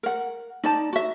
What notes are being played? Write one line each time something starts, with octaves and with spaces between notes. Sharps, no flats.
A#4 F#5
D#4 D5 A5
F#4 E5